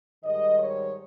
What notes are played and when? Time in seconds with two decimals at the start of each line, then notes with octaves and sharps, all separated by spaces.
0.24 G#2 D#3 G3 D#5
0.59 C#5